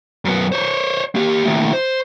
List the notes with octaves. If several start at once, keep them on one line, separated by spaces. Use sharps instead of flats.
F#2 B3
C5 C#5
A#3 G4
D#2 A2
C5